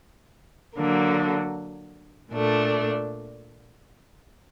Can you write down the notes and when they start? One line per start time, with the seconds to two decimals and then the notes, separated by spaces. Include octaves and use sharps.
0.76 D3 F#3 A#3
2.31 A#2 A3 D4